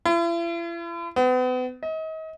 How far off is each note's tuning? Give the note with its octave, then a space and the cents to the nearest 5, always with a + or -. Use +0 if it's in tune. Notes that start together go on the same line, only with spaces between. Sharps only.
E4 +45
B3 +40
D#5 +35